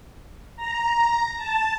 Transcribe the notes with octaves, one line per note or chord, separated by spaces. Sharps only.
A#5
A5